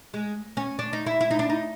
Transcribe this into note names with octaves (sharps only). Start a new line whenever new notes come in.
G#3
C#4
D4
D#4
E4
E4
D#4
D4
D#4